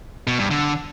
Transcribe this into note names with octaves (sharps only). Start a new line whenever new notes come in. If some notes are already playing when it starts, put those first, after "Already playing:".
B2
G2
D3